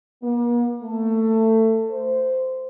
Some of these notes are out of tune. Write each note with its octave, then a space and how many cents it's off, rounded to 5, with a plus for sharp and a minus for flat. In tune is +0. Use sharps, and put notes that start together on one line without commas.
A#3 +45
A3 +20
C5 -15